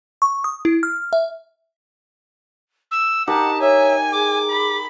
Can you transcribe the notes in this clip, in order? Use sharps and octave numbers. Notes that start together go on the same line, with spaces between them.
C#6
D#6
E4
F6
E5
E6
D#4 G4 A#4 F#5 A5
C#5 E5 G#5
G#4 D6
B5